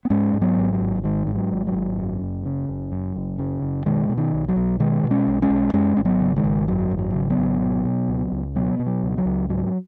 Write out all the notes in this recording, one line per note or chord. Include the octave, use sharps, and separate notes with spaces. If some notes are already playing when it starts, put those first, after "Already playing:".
B3
G#2 G#3 C#4
G#2
F#3 B3
G#1
F#3
G#1
G#2 D#3
G#2
F#3
G#1
F#3
G#1
F#2
F#1
C#3
F#1
F#2
F#1
C#3
F#1
B2 D#3 G#3
B2
D#3
B1
F#3
B1
B2 D#3 G#3
B2
G#3 C#4
B1
G#3 C#4
B1
F#2 G#3 C#4
G#1 C#4
F#3 B3
C#3
D#3 G#3
G#1
F#2 F#3
G#1
F#3
C#3
F#3 B3
G#1
B2
B2
C#2
C#2
B2 F#3 B3
B2
F#3
C#2
F#3
C#2
G#2 F#3